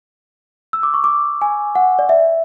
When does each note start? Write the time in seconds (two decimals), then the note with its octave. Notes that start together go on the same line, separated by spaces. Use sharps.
0.73 E6
0.83 D6
0.94 C#6
1.04 D6
1.42 G#5
1.75 F#5
1.99 D5
2.09 E5